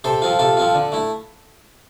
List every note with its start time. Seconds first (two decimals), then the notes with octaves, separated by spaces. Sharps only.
0.04 C3 A4 C5
0.22 F3 C4 F4
0.39 C3 F4 A4
0.57 F3 C4 F4
0.75 D3
0.92 A3 E4